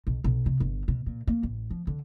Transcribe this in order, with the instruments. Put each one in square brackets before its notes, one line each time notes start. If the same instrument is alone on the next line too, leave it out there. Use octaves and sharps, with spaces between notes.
[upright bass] B1
B1
C3
G1
B2
A#2
A#3
A1
F3
D3